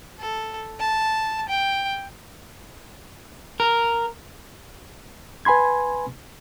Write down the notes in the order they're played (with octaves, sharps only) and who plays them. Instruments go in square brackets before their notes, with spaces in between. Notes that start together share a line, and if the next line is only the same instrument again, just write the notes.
[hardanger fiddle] A4
A5
G5
[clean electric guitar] A#4
[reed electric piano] B4 G#5 B5 C6 G#6